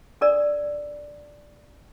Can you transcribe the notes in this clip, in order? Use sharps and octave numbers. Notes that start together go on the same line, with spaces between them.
D4 A4 A#4 D5